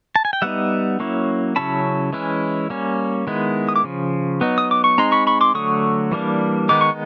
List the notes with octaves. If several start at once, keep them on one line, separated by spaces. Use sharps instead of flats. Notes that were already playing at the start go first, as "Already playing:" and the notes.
A5
G#5
G5
G3 B3 D#4 E5 F#5
F#3 A#3 C#4 E4
C#3 F#3 A3 C#4 E4 A5 B5
E3 G#3 C#4 E4
G3 A#3 C#4
D#3 G#3 B3 E4
D#6
D6
C#3 F3
F#3 B3 D#4
D#6
D6
C#6
G#3 C4 D#4 A#5 C6
B5 C#6
B5 C#6
C6 D6
D3 F#3 A3 C#6 D#6
E3 G3 A#3 D4
D#3 G#3 B3 D#4 D6
C#6